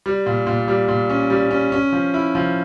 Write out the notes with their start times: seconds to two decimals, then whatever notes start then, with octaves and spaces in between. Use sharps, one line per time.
0.06 G3
0.26 A#2
0.47 A#2
0.68 G3
0.88 A#2
1.10 C#4
1.30 G3
1.51 C#4
1.72 C#4
1.93 F3
2.14 E4
2.35 F3